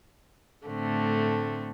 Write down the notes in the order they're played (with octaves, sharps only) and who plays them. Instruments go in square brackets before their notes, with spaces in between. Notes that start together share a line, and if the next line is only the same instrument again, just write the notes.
[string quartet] A2 D3 A3 C4